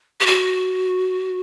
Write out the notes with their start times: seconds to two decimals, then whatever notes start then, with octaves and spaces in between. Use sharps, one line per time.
0.20 G4
0.26 F#4